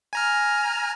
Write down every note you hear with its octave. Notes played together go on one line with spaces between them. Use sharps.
G#5 A#5 F6